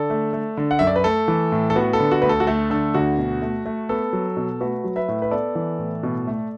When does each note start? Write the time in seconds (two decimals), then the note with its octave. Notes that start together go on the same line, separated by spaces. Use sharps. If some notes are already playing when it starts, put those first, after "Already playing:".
Already playing: D3 A4 D5
0.10 A3
0.33 A3
0.57 D3
0.71 F#5
0.79 F#2 E5
0.87 D5
0.96 B4
1.04 A3 A4
1.28 E3
1.52 A2
1.70 A4
1.76 B3 F#4
1.93 A4
2.00 D3
2.11 F#4
2.22 D2 B4
2.29 A4
2.40 F#4
2.47 A3 A4
2.70 D3 A4
2.94 D2 F#4
3.18 B2
3.42 A3
3.66 A3
3.89 B3 A4
4.13 F#3
4.37 B2
4.61 A3 F#4 B4
4.84 F#3
4.96 B4 E5
5.08 A2
5.22 B4
5.31 B3 A4 D5
5.55 E3
5.79 A2
6.03 B2
6.27 A3